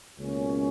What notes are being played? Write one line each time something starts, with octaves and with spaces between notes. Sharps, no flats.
C#2 B2 A#3 C#4